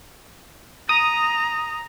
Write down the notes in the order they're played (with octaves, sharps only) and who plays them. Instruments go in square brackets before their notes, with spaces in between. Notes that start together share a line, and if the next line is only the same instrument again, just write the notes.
[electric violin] A#5 [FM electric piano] D#6